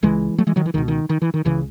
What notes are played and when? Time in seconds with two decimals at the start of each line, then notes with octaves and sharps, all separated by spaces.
0.03 C#2 C#3 E3 G#3
0.38 F#3 A3
0.47 E3 G#3
0.56 D#3 F#3
0.66 E3
0.74 C#2 B2 D#3
0.88 D#3
1.09 D#3
1.22 E3
1.34 D#3
1.45 C#2 C#3 E3